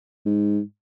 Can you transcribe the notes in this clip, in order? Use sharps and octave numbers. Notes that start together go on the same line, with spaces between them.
G#2